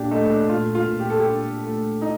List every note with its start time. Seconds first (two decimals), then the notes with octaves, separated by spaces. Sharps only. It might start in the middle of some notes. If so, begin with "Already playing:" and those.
Already playing: A#2 D4 G4
0.11 A3 D#4
0.30 D4
0.49 A#2 F4
0.75 F4
0.87 A#2
1.00 G4
1.10 A4
1.19 G4
1.25 D4
1.63 A3
2.02 D#4